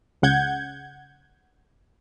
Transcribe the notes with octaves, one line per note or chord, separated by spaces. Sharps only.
C#2 C#3 F#5 G6 G#6